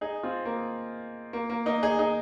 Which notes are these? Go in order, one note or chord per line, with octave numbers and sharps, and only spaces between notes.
D#4 G#4
C4 F4
A#3
A#3
A#3
A#3 D#4
D#4 G#4
D#4 G#4